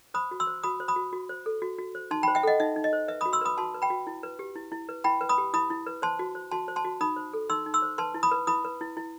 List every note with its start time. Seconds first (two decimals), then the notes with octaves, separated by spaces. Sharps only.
0.14 C5 B5 D#6
0.31 F#4
0.40 C6 E6
0.47 C5
0.63 F#4 B5 D#6
0.80 C5
0.88 B5 D#6
0.96 F#4
1.13 F#4
1.29 C5
1.46 A4
1.62 F#4
1.78 F#4
1.95 C5
2.11 D#4 A5 C6
2.23 G5 B5
2.28 C5
2.35 E5 G5
2.43 A4 D#5 F#5
2.60 D#4 E5
2.76 D#4
2.84 D#5
2.93 C5
3.08 B4 E5
3.21 B5 D#6
3.25 F#4
3.33 C6 E6
3.41 B4 B5 D#6
3.58 F#4 A5 C6
3.74 B4
3.82 G5 B5
3.90 F#4
4.07 E4
4.23 B4
4.39 G4
4.55 E4
4.72 E4
4.89 B4
5.04 E4 G5 B5
5.21 B4
5.29 B5 D#6
5.38 G4
5.54 E4 B5 D#6
5.70 E4
5.87 B4
6.02 C5 A5 C6
6.19 F#4
6.35 C5
6.52 F#4 A5 C6
6.68 C5
6.76 A5 C6
6.85 F#4
7.01 D#4 B5 D#6
7.16 C5
7.33 A4
7.50 D#4 C6 E6
7.66 D#4
7.74 C6 E6
7.82 C5
7.98 B4 A5 C6
8.14 E4
8.23 B5 D#6
8.32 B4
8.47 E4 B5 D#6
8.65 B4
8.81 E4
8.97 E4